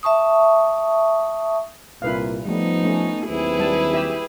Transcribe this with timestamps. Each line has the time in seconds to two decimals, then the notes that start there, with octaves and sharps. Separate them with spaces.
0.03 E5 A5 C#6 D#6
2.02 C2 A#2 E4 B4 F5
2.45 F3 G3 A3 B3 D#4
2.83 A3 C#4
3.26 D#2 F#3 C4 E4 G#4 B4
3.59 G3 A5
3.94 G4 E5